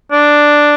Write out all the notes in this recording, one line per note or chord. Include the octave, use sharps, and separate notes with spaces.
D4